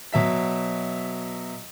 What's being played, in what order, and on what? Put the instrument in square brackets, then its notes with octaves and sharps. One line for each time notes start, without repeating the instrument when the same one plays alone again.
[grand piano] B2 F#3 E5 B6